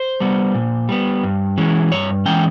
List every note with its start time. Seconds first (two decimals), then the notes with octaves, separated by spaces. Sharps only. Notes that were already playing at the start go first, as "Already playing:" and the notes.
Already playing: C5
0.20 G3 B3
0.55 A#2
0.89 G3 B3
1.24 G2
1.57 E3 G#3 C#4
1.92 G2 C#5
2.25 E3 G#3 C#4 G5